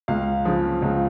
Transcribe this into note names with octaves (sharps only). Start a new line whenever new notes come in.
C#2 F5
C#3 F3
C#2